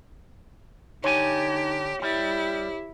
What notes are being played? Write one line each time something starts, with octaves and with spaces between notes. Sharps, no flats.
D3 D#4 G4 C#5 G#5
G3 E4 G4